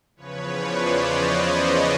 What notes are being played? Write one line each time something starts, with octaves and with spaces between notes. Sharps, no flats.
E2 C#3 F3 B4 C#5
C5 D5
C#5 D#5